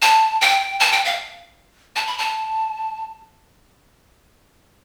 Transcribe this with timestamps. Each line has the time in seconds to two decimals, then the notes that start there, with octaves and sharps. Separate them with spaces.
0.02 A5
0.41 G5
0.80 A5
0.92 G5
1.05 F5
1.96 A5
2.07 B5
2.18 A5